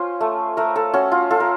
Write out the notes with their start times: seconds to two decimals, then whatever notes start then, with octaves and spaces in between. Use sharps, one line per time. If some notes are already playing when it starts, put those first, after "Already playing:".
Already playing: C#4 F4 C5
0.21 A3
0.57 A3 A#4
0.76 A4
0.94 C#4 F#4
1.12 F4
1.31 F4 A4
1.40 A#4